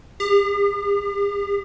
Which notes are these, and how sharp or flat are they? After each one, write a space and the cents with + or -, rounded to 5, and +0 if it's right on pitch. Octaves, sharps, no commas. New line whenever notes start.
G4 +45